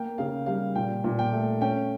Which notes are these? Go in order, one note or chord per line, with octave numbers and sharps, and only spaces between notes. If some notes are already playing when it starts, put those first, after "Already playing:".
Already playing: A#3 G5
C#3 F5
G3 F5
A#2 G5
A#2
G5
A3
C#4 G5